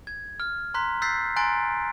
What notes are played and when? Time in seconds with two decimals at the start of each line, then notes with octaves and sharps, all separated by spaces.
0.07 G#6
0.40 F6
0.74 A#5 C6 F#6 B6
1.02 E6 F#6 G6 A6 B6 C7
1.36 G#5 A#5 C6 F#6 A6 D7